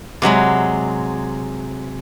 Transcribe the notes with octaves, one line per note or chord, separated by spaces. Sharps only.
C3 F#3 G#3 B5